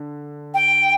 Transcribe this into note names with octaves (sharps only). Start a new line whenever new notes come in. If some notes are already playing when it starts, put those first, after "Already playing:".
Already playing: D3
G5